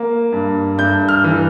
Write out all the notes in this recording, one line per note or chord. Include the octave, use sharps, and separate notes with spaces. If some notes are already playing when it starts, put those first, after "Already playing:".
Already playing: A#3
G2
G2 G6
F6
E3